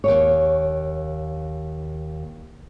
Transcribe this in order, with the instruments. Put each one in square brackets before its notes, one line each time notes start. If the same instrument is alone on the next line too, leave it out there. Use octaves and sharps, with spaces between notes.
[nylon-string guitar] D#2 A#2 C#5